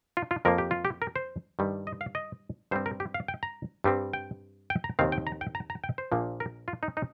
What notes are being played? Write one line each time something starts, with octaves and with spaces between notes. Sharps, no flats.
F4
F4
F2 F3 A#3 A#4
G4
F4
G4
A#4
C5
G2 D#3 G3
D#5
F5
D#5
G2 G3 C4 C5
A#4
G4
F5
G5
A#5
G2 G3 C4
G5
G5
A#5
D#2 D#3 C4 F5
G5
A#5
G5
A#5
A#5
G5
C5
A#1 A#2 F3 A#3
A#4
F4
D#4
D#4